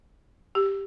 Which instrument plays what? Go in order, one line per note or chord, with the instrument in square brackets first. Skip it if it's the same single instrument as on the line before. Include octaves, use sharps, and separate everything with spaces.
[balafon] G4